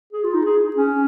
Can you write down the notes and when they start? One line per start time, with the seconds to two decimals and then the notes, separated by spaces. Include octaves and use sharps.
0.13 G#4
0.24 F4
0.34 D#4
0.45 G#4
0.76 C#4